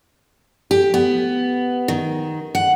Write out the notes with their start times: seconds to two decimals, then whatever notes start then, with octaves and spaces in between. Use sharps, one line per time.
0.71 G4
0.94 B3
1.88 D#3
2.55 F#5